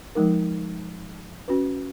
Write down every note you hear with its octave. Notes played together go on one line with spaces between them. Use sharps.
F3 G#3 D#4 A#4
C#4 F#4 B4